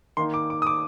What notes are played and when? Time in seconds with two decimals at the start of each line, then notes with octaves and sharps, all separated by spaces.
0.17 D#3 A#3 D#4 C6
0.34 D6
0.50 D6
0.62 D#6
0.67 D6